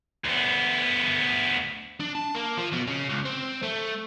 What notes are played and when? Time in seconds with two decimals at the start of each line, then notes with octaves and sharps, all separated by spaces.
0.25 D2 B3
2.00 D4
2.15 A5
2.35 A#3
2.57 F3
2.73 B2
2.87 C#3
3.09 C#2
3.25 C4
3.63 A3